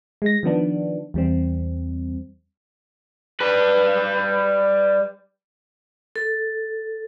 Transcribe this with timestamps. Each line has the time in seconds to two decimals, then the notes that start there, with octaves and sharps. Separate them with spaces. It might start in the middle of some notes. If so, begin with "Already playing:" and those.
0.22 G#3 A#6
0.43 D#3 F3 B3 D4
1.14 E2 G3 C4
3.40 G3 B4
6.16 A4